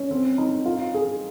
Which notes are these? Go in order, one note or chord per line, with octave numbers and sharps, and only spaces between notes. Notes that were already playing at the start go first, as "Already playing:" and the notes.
Already playing: C#4
C4
D#4
F4
G#4